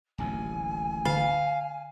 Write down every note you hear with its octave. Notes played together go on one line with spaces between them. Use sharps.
D1 A1 D#2 G#5
D3 F5